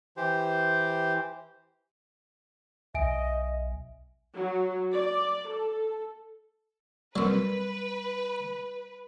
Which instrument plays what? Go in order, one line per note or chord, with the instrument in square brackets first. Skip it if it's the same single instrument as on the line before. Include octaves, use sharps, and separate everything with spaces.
[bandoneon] E3 G4 C5
[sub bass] B1 [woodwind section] D#5 [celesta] E5 G#5 D7
[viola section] F#3
D5
A4
[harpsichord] F#3 C4 [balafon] G3 A#4 [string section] B4